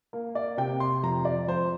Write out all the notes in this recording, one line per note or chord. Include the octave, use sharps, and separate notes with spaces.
A#3
D5
C3 G5
C6
F2 A#5
D5
F2 C5